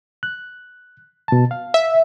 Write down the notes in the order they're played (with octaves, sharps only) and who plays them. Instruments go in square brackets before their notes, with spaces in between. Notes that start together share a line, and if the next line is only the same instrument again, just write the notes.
[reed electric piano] F#6
B2 A5
F5
[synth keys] E5